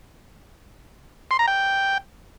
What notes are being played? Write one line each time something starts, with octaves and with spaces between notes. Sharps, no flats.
C6
A#5
G5